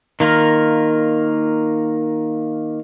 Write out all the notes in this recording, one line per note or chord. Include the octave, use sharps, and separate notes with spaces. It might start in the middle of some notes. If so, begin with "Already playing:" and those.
D#3 A#3 F4 A#4